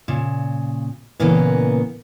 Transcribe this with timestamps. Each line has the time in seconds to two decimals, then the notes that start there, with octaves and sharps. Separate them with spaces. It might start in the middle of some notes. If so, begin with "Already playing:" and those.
0.08 A#2 C#3
1.20 A#2 C#3 E3 A#3 B3